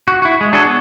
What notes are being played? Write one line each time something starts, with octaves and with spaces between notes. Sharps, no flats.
F#4
E4 F#4
G#3
D4 F#4 G#4 A4 C#5
B3